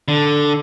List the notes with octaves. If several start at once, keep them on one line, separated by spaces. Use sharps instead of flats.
D3